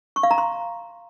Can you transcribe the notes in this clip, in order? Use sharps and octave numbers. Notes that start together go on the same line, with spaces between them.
C#6
F5
A#5
C6